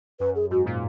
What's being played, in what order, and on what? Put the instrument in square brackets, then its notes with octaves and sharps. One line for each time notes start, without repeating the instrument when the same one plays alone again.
[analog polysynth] F#2 [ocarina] B4
[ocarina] G#4
[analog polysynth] G#2 [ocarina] F#4
[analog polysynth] A#2